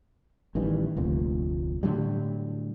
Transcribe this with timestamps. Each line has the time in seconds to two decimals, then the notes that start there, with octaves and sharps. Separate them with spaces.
0.55 A1 D#3 E3 G3
0.96 F1 D2 A#2
1.83 A2 D3 F#3 G3